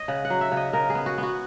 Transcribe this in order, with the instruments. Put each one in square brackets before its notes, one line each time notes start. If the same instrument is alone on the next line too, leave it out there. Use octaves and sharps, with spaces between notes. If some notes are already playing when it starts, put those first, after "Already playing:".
Already playing: [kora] C#5 D#5
C#3 F#5
F#5
F#3
E5
C#3
D#5
C#3 A#4
G#4
B3
F#4
B3 F#4